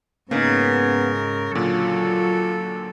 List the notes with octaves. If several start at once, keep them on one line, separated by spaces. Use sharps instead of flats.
G#2 C#3 A#3 B3 D#4 A#4
A#2 D3 F#3 F4 A4